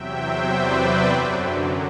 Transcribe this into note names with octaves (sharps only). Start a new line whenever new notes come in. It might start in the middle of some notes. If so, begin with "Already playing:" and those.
Already playing: E2 C3 F#3 E5 G5
C5 E5
B4 D5
F#2 D3 F#3